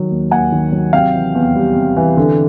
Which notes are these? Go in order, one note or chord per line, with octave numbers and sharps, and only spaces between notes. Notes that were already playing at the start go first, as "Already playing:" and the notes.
Already playing: D#3 F#3
D#2
D#2 F#5 G#5
D#3
F#3
C3 F5 G5
E3
E2
G3
C3
E3
D3